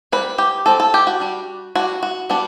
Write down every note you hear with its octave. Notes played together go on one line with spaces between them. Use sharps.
G3 C4 B4
G4
G3 C4 A4
A4
G4
F#4
G3 D4
G3 D4 F#4
F#4
G3 B3 D4